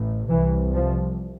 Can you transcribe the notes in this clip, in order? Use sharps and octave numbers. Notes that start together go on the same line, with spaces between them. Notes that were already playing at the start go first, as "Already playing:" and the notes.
Already playing: A1 A2
C2 C3 E3
F3